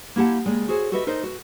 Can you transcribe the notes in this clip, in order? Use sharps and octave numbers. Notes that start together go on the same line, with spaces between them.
A#3 E4 G4 F#5 A5
C#3 G#3 A#3 D5 G5
F#4 G#4 A4 C5 C#5
F#4 G4 A4 B4 D#5 E5
D#4 A#4 C5 D5 D#5
F#4 B4